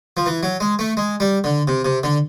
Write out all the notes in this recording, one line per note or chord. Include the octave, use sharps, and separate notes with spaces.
F3
E3
F#3
G#3
A3
G#3
G3
D3
C3
C3
D3